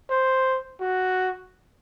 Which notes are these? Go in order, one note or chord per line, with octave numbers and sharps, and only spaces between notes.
C5
F#4